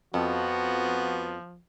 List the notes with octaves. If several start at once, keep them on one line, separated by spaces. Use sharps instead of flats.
F2 F3 B3 F#4